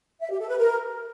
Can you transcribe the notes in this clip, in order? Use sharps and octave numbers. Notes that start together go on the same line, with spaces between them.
E5
G4
A4
B4
A#4